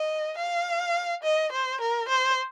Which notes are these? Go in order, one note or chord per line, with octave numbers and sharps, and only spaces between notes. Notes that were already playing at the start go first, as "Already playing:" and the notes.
Already playing: D#5
F5
D#5
C5
A#4
C5